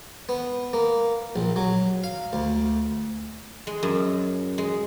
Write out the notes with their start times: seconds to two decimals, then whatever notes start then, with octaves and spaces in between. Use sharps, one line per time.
0.29 B3
0.73 A#3
1.36 A#1
1.56 F#3
2.04 F5
2.33 D2
3.67 G#3
3.83 F#2
4.58 G#3